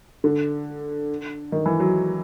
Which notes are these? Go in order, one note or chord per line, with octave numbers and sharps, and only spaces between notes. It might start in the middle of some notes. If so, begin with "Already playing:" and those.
D3
D#3
E3
F#3